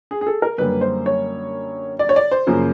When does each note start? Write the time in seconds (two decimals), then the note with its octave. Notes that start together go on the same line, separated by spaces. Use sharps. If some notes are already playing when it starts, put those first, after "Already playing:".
0.11 G#4
0.21 G#4
0.27 A4
0.42 A#4
0.58 F#2 D3 G3 A#3 B4
0.81 C5
1.06 C#5
1.99 D5
2.09 C#5
2.16 D5
2.31 C5
2.47 F#2 C#3 F3 A#3